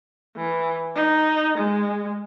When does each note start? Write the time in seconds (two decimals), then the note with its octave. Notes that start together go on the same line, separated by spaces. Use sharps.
0.37 E3
0.96 D#4
1.58 G#3